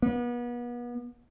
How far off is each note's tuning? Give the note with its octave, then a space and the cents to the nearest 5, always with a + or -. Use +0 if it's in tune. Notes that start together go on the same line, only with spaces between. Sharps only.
B3 -35